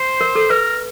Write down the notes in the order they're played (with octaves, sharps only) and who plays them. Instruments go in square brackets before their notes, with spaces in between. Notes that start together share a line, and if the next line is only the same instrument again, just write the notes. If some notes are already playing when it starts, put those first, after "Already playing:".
Already playing: [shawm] C5
[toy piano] A#4
A4
[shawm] A#4 [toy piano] B4